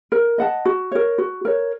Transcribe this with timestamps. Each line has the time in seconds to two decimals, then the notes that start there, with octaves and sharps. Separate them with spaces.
0.12 A#4
0.38 D#5 F#5 A5
0.65 F#4
0.92 A#4 C#5
1.18 F#4
1.45 A#4 C#5